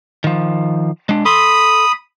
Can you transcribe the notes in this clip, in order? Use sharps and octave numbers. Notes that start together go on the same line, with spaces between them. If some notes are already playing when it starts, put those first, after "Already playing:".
D#3 F3
G#3 D4
A4 B5 C6 D#6